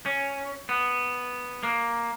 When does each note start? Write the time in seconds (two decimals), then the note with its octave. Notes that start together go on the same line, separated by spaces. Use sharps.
0.06 C#4
0.69 B3
1.63 A#3